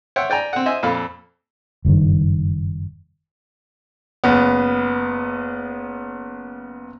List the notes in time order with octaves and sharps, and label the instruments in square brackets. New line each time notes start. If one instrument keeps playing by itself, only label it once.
[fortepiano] C#5 E5 F#5 G5 C6
D5 G5 G#5 A#5
C4 F#5
C5 D#5 E5 G#5
F2 A#2 A4 F5 B5
[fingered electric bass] F#1 G2 A#2 D#3
[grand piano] F#1 B3